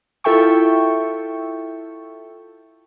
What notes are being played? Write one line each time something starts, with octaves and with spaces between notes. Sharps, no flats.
E4 F4 A4 E5 G5 C#6